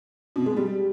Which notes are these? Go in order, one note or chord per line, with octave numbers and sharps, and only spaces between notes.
B2
G#3
G3